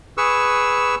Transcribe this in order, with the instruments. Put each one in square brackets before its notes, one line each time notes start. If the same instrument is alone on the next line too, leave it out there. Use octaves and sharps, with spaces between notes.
[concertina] G#4 B4 C#6 E6